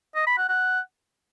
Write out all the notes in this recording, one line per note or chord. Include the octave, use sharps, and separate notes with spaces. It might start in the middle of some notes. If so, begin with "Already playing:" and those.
D#5
B5
F#5
F#5